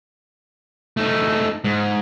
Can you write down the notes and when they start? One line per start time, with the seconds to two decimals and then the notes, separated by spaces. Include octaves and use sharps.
0.97 A3 D#4
1.64 G#2